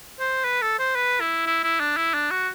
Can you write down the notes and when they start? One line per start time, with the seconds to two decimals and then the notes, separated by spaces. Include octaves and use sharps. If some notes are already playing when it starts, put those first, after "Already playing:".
0.20 C5
0.44 B4
0.62 A4
0.79 C5
0.95 B4
1.21 E4
1.46 E4
1.63 E4
1.80 D4
1.97 E4
2.14 D4
2.31 F#4